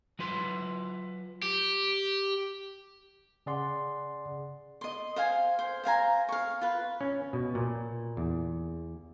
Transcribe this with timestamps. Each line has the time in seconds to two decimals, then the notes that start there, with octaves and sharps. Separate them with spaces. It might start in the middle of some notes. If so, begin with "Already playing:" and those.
0.19 F#3 F4 B4 C6
1.42 G4
3.46 C#3 G#4 D5 F#5 C6
4.81 D#5 C6
5.16 C5 F5 G#5
5.59 C5
5.84 C5 F5 G#5 A#5
6.29 F5 C#6
6.62 F4 B4
7.01 C#4
7.33 B2
7.55 A#2
8.17 E2